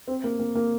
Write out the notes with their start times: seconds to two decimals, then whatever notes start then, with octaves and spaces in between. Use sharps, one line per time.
0.08 C4
0.24 A#3
0.39 A#3
0.55 A#3